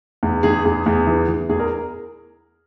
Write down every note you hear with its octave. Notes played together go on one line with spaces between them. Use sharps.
E2
E2 G#4
E2 G#4
E2
E3
E3
E2 G#4
A#4